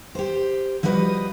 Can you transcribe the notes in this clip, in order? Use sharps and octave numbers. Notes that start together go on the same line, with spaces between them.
G4 C5
F3 G3 F#4 B4 D5 D#5